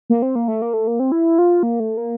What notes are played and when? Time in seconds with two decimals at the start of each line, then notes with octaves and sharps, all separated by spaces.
0.10 A#3
0.22 C4
0.35 A#3
0.48 A3
0.62 A#3
0.74 A3
0.87 A#3
1.00 C4
1.12 E4
1.38 F4
1.63 A#3
1.80 A3
1.97 A#3